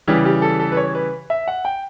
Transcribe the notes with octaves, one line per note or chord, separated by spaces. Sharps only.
C#3 E3 G3 G4
G4
A4
A4
B4
C#5
B4
E5
F#5
G5